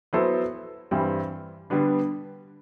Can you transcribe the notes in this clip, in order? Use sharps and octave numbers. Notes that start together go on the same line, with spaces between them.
F#3 B3 E4 A4 C5
G2 E3 G3 C4
D3 G3 B3 D4